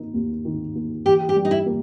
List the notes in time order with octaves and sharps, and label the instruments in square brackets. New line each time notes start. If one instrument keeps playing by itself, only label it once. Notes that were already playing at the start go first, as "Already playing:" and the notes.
Already playing: [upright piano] D#3 A#3 D#4
D#2
D#3
A#3
[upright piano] E3 [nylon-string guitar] G4
[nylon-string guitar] G4
[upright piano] G3
[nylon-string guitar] D#4
E4
[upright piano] A#3